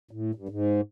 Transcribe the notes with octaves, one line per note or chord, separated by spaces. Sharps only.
A2
G2
G#2